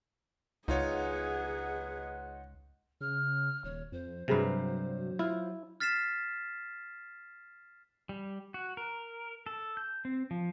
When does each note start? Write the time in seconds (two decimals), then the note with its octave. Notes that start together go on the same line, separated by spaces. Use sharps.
0.68 C#2 G#3 D#4 F4 G#4 B4 C#5 F#5
3.01 C#3 F6
3.64 D#1 C#5
3.92 F2 C5
4.28 G2 C3 F#3 G#4 A#4 B4
5.19 E4 F4
5.80 F6 A6 B6 C7 E7
8.09 G3
8.54 F#4
8.77 A#4
9.46 A4
9.77 G6
10.05 C4
10.31 F3